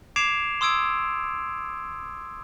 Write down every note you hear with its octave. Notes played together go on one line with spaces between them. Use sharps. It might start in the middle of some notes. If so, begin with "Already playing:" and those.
D6 G#6 C7 D7 E7 F7
C6 D#6 E6 G#6 D7